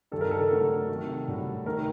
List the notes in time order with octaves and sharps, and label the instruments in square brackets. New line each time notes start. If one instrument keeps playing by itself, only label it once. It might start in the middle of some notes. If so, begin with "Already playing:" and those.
[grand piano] G2 D#3 G3 D4 [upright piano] A4
[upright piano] A#4
A4
[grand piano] F#3 A3 D4 F#4
C3 D#3 F#3
A2 G3 D4 F#4
[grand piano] D#3 A3 D#4 [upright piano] A#4